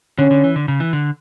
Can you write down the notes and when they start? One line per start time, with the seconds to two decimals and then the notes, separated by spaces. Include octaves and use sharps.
0.19 D3 C#4
0.31 D3
0.44 E3
0.56 D3
0.68 C#3
0.80 E3
0.93 D3